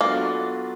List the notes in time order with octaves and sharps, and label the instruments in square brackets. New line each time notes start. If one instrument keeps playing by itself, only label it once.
[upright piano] F#3 B3 D4 F4 A4 [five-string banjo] A#3